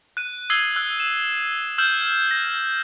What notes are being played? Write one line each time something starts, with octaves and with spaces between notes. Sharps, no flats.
F#6 D#7
D#6 E6 G#6 C7 F#7 G7
E6 F#6
E7
E6 F6 G6 E7 F#7
A#6